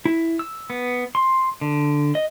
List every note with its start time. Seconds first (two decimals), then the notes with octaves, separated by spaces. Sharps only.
0.05 E4
0.39 E6
0.70 B3
1.15 C6
1.61 D3
2.15 D#5